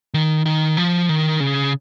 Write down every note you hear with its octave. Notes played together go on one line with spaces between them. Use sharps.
D#3
D#3
F3
D#3
C#3